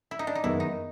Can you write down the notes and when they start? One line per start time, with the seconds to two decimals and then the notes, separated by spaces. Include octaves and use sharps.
0.11 E4
0.19 D#4
0.27 D4
0.35 D#4
0.43 F#2 D#3 G#3 B3 E4
0.60 D#4